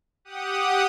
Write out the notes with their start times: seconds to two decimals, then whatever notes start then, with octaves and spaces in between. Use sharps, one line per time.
0.25 G4 F#5 D#6